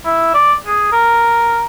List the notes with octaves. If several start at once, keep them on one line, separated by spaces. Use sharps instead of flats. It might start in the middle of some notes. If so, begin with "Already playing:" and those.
E4
D5
G#4
A#4